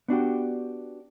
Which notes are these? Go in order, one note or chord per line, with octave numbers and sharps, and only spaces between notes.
B3 D4 F#4 G4